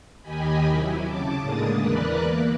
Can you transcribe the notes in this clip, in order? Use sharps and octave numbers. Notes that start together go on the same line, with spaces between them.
D#2 D#3 G4 D#5 G#5 B5
C3 F#3 E4
C#3 A5 D6
A2 D3 G#3 A#3 D#6 A6
E2 E3 A#4 B4 D5 F#6
A#3